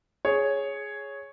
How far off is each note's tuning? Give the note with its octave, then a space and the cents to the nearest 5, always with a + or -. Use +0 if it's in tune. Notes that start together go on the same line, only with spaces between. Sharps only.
G#4 +5 C#5 +0